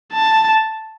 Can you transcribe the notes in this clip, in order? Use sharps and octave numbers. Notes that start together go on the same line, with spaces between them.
A5